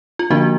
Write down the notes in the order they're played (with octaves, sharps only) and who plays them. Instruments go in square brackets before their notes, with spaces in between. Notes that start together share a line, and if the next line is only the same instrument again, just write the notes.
[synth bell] F4
D3 F3 A#3 D4 F#4